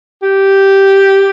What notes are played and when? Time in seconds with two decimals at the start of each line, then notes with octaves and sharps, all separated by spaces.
0.22 G4